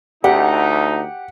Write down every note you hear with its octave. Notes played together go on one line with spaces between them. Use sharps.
D2 D#4 G4 F#5